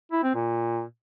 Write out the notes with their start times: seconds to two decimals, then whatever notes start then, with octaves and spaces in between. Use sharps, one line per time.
0.12 E4
0.23 C4
0.35 A#2